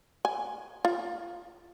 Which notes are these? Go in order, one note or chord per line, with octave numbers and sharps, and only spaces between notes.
G#5
F4